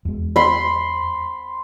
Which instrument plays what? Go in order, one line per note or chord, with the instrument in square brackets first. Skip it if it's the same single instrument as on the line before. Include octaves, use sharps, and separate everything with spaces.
[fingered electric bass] E2 G#3
[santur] B5 C6